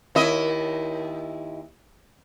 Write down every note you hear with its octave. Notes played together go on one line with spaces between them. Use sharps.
D#2 E4 D#5